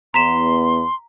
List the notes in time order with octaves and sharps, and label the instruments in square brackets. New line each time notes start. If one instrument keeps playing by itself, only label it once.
[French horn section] E2 B3 [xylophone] A#5 B6 E7 [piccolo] C6